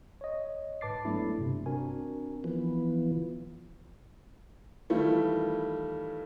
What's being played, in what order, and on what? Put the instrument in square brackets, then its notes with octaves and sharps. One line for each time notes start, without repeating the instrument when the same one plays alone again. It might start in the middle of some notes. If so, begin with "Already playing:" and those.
[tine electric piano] C#5 D#5
G#2 B4 A5 D6 A6 C7
F#3 G#3 A3 B3 D4 E4
G2 C3
C4 D4 F#4 A#4 G#5
[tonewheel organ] E3 F3 B3
[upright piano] D#3 E3 G3 A3 E4 F4